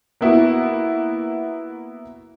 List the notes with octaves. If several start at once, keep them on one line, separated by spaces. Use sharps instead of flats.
A#3 B3 E4 F#4